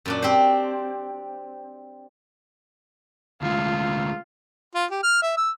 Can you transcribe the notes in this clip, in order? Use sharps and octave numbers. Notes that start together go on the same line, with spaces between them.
F#2 A#2 D4
C4 G4 C5
D2 G#3 F4
F4
G4
F6
E5
E6